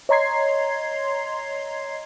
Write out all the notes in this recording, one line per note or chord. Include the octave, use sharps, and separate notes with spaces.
C#5 D#5 A#5 C6 G#6 C7